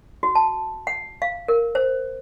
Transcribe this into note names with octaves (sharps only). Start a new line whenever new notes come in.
F#4
A5
F#5
F5
A#4
C5